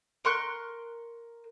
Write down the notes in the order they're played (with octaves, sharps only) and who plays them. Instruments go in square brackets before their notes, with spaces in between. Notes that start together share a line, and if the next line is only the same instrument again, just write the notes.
[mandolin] A#4 C6 C#6 F#6